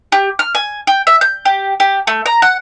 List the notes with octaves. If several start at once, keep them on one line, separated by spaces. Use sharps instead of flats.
G4
F6
G#5
G5
E5
G6
G4
G4
A3
A#5
F#5